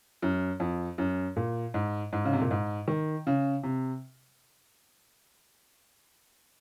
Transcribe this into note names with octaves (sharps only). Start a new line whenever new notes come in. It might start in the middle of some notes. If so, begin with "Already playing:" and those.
F#2
F2
F#2
A#2
G#2
G#2
C#3
C3
A#2
G#2
D#3
C#3
C3